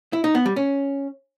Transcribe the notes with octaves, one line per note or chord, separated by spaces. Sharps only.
E4
D#4
B3
G3
C#4